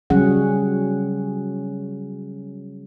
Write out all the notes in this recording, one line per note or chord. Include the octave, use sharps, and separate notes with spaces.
C#3 F#3 G3 C#4 G#4 F#5